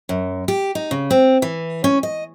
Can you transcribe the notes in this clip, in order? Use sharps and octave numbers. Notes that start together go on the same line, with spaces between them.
F#2
G4
D#4
C#3
C4
E3
C#4
D#5